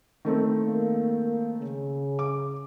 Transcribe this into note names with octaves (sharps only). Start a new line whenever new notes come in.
D#3 A3 C4
A#3
C#3
D6